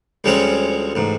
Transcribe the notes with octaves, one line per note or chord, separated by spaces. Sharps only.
D2 F3 G3 G#3 C4 C#4
A1 G#2